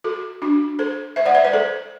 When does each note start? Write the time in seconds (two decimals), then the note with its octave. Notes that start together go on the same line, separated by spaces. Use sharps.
0.04 F#4 A4
0.42 D4 F#4
0.79 A4 C5
1.16 C5 E5
1.26 D5 F#5
1.35 C5 E5
1.45 B4 D5
1.53 A4 C5